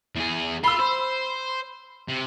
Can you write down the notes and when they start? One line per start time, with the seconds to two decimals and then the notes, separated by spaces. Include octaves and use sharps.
0.16 E2 G#4
0.64 F4 B5 E6
0.79 C5
2.08 C3